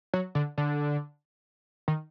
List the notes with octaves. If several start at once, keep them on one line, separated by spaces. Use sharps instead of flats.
F#3
D3
D3
D#3